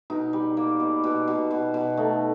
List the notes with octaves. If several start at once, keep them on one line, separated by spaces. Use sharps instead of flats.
B2 D#4
G3
A#3
B2
B2
B2
B2
B2
A3 D#4